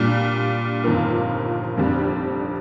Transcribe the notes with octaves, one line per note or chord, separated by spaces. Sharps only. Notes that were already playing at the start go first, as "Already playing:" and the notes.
Already playing: A#2 G3 D4
G1 F2 D#3 A#3 F4
F1 F2 D3 G3 D4